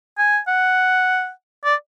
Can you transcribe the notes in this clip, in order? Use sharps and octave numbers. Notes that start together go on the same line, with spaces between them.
G#5
F#5
D5